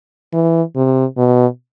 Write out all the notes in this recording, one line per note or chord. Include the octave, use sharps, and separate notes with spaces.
E3
C3
B2